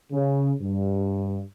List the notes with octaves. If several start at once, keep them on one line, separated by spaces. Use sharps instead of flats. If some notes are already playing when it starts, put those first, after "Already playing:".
C#3
G2